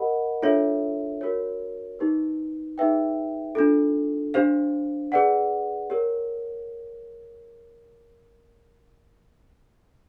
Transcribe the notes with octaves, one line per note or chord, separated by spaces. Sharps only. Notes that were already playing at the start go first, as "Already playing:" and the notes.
Already playing: G4 A#4 D#5 F#5 B5
D4 F4 A4 C#5 E5
F#4 A#4 C#5
D#4 G4 B4
D#4 G#4 B4 E5 G5
D4 F4 A4
D4 G4 C5 F5
G#4 B4 D5 F#5
G4 A#4 C#5